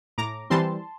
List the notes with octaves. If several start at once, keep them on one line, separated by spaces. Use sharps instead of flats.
A2 A#5 D6
E3 G3 C4 A5 C6